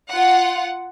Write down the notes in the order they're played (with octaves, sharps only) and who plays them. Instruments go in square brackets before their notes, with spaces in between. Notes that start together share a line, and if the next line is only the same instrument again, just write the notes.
[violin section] F4 F#5